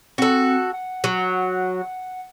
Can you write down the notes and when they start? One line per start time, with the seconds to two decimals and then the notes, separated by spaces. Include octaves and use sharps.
0.18 C4 F#4 A4
0.73 F#5
1.04 F#3